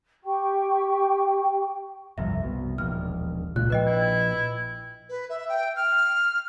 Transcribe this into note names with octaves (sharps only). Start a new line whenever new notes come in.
G4 G5 C#6
G1 C2 F2 E5
C2 B2
E1 A#1 D#2 F6
C#2 A#2 F#6
A#1 B4 D#5 G5
E4
B4
E5
G5
F6